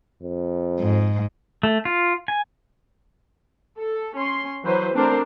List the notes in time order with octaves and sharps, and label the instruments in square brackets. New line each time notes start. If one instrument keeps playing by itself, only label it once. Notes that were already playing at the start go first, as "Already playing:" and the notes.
[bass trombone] F2
[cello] G#2
[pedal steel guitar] A3
F4
G#5
[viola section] A4
C#4 C6
E3 F#3 B4 C5
A3 C4 D4 A#4 C5